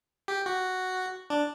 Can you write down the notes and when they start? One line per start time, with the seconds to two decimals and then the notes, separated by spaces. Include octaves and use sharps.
0.28 G4
0.46 F#4
1.30 D4